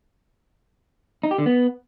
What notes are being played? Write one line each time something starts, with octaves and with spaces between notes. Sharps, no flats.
D#4
G4
D3
B3